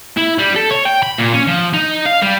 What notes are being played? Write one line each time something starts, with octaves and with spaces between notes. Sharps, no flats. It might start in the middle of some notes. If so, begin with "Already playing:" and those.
E4
G3
A4
C#5
G5
B5
A#2
C#4
F3
D#4
F5
G3